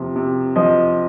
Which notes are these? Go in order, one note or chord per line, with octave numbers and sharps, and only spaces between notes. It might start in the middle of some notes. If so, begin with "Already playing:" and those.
Already playing: C3 F3 A#3
C3
F3 D#5